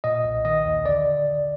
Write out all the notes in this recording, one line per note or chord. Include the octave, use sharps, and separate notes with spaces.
A#2 D#5
B1
D#3 D#5
D#2
D3 D5